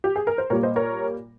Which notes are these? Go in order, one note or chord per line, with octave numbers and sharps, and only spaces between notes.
G4
G#4
A#4
C5
A#2 G3 A#3 A#4 C#5
C5 D#5
A#4 C#5